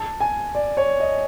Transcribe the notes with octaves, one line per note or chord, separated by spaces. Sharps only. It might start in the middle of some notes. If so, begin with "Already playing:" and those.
Already playing: A5
G#5
D5
C#5
D#5